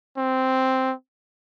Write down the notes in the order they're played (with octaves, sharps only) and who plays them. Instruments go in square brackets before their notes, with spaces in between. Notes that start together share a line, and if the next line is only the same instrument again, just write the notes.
[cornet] C4